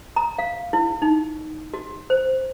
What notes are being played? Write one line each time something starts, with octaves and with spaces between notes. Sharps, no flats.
A#5
F5
E4
D#4
F#4
C5